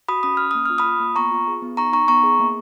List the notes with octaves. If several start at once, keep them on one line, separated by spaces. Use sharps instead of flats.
F#4 B5 D#6
C#4 D#6
C#4 F6
A#3 D#6
F4 F6
B5 D#6
F4
A#3
B3 A#5 C#6
F4
G#4
B3
D#4 A#5 C#6
D#4 A#5 C#6
B3 A#5 C#6
G#4
A#3